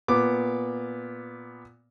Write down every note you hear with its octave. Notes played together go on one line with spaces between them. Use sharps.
A#2 B3 D6